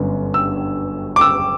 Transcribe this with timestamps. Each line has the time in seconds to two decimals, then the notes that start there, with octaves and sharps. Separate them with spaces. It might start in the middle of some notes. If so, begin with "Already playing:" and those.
Already playing: G1 F#2 D3
0.34 E6
1.16 D6
1.21 E6